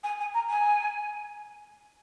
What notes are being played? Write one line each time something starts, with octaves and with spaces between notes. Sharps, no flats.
G#5
G#5
A#5
G#5